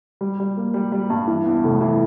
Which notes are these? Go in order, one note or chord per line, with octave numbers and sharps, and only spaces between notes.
G3
G3
A#3
G3
G3
G2
E3
E2
F1
E3